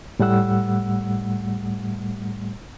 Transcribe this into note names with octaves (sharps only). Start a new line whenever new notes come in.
A2 G3 A3 F#5 E6